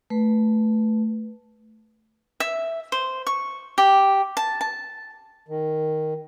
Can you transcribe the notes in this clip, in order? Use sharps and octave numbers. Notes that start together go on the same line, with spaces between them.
A3 B4
E5
C5
C#6
G4
A5
A5
D#3